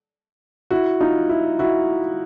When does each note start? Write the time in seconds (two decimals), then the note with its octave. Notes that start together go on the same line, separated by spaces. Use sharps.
0.71 E4 F#4
1.01 D#4 F4
1.29 E4
1.59 E4 F#4